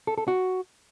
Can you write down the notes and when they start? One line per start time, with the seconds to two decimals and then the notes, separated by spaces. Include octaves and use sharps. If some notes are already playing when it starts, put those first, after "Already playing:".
0.07 A4
0.18 A4
0.28 F#4